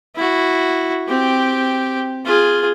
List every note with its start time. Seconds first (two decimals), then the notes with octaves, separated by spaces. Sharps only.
0.16 E4 F#4
1.08 C4 G4
2.25 F4 G#4